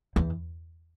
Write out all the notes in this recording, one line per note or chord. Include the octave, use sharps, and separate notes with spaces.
E2